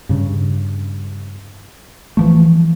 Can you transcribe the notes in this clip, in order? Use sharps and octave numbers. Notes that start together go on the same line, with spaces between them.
G2 C#3
E3 F3 A3